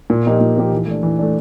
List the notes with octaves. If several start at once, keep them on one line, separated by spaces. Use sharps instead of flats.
A#2
F3 A#3 D#4 G4
A#2
F3 A#3 D#4 G4
E3
A3 D4
E3
A3 D4